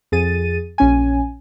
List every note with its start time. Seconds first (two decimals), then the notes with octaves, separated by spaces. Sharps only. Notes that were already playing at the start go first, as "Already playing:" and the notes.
0.12 F2 G#4 A6 D#7
0.78 A#1 C#4 G#5